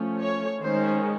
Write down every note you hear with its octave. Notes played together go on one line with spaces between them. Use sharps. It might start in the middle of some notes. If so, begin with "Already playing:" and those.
Already playing: F3 A3 C#4
C#5
D#3 G#3 C#4 C5